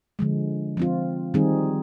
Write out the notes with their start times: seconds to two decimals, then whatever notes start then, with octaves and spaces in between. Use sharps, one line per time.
0.19 D3 F3 G#3
0.77 F3 C4 F4
1.34 D#3 G3 C4 D#4 G#4